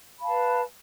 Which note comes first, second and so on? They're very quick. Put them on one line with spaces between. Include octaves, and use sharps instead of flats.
B5 F5 A5 B4